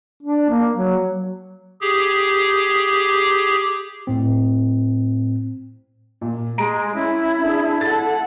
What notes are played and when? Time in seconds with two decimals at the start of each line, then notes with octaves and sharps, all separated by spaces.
0.23 D4
0.49 A#3
0.75 F#3
1.81 G4 G#4
4.07 A2 C4
6.21 A#2
6.58 G#3 A#5 D7
6.95 C#4 E4
7.41 D4 G#4
7.81 A4 F#5 A6